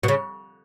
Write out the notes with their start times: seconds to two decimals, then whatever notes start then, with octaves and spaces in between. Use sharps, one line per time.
0.03 B2
0.08 C#3